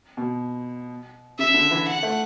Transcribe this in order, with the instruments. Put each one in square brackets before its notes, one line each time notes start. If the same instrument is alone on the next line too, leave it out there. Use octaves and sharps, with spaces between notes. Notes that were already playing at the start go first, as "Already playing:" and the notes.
[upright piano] B2
[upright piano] C#3 [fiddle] E5
[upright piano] D3
E3
[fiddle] F#5
[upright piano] A3